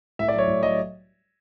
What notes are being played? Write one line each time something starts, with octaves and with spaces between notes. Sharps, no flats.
A2 E5
D5
F#3 C#5
A2
F#3 D#5